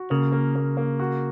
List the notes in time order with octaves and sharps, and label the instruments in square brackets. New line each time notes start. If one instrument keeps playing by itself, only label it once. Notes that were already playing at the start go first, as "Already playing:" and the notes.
Already playing: [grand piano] F#4
[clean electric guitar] C#3 [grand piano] A#3
[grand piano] A#3
A#3
A#3
F#4